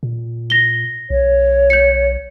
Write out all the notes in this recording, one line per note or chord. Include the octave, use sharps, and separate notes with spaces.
A#2
A#6 G7
B1 C#5
G6 C#7